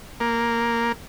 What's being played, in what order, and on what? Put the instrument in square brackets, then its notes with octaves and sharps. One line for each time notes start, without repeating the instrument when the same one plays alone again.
[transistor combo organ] A#3